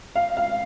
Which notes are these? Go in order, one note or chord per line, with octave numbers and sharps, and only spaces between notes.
F5
F5